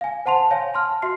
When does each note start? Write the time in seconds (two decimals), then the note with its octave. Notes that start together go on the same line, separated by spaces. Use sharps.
0.01 F5 G#5
0.26 C5 F#5 A5 C6 F7
0.51 C#5 F5 G#5
0.74 A5 C6 F6
1.02 F#4 E5 C6 C7